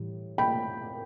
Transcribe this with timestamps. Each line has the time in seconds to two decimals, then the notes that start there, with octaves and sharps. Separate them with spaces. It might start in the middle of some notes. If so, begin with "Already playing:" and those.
Already playing: A2 E3 G3
0.38 G5 B5